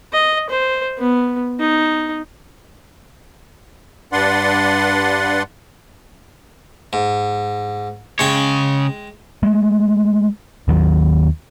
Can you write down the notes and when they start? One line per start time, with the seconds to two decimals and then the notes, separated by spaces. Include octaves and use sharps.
0.13 D#5
0.49 C5
0.98 B3
1.59 D#4
4.12 G2 D4 B4 D5 F#5 C6
6.93 G#2
8.19 C#3 G#3 C#5 G5
9.43 G#3 A3
10.68 D#2 D#3 F#3